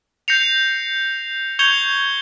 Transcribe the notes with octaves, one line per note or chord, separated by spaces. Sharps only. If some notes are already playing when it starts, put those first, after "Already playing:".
G6 A#6 C7 C#7 F7
C#6 G6 G#6 C#7 F7 G7